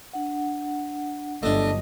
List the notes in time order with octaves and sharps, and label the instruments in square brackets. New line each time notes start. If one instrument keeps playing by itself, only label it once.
[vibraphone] D4 F#5
[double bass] G1 [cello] F#3 D#5 [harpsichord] A3 D4